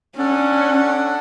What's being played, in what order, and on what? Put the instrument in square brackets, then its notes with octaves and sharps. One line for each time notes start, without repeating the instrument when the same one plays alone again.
[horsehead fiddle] C#4 [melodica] D4 A4 D5 F#5